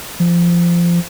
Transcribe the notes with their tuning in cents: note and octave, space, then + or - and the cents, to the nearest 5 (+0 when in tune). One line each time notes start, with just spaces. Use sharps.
F3 -20